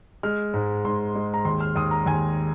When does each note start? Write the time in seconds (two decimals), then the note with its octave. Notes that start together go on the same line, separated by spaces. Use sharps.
0.23 G#3 F6
0.54 G#2
0.85 G#2 C6
1.15 G#3
1.34 A#5
1.45 D#2 C6
1.61 F6
1.76 D#2 D#6
1.91 A#5
2.06 D#2 G#5